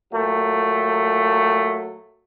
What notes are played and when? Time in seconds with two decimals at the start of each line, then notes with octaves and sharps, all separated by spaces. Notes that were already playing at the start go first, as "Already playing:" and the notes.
0.13 A#2 F#3 A3